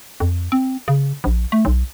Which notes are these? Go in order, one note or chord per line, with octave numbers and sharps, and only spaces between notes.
F2
C4
C#3
A#1
A3
B1